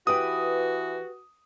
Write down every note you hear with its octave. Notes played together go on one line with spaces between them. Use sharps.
E3 F#4 G4 B4 G5 D#6